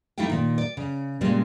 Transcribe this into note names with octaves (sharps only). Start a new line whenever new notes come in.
A3 D#4 E4 G4 F5 G5
A#2 D#3
D5
C#3
A#2 C#3 G3 G#3 A#3